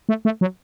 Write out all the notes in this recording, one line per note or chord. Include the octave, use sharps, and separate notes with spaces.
A3
A3
F#3